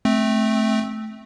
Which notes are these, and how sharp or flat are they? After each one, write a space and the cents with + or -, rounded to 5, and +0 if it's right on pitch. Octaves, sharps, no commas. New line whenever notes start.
A3 -15 C4 +0